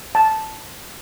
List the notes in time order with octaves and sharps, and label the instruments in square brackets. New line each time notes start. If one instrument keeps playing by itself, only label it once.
[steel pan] A5